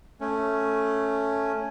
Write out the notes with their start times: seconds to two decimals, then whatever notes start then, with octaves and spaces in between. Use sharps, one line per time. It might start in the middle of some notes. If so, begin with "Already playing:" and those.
0.21 A3 C#4